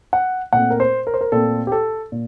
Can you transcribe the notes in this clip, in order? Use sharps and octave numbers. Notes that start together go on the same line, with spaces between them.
F#5
A#2 A3 C4 F#5
A#4
C5
A#4
C5
A#4
A#2 A3 C4 A4
G4
A4
A#2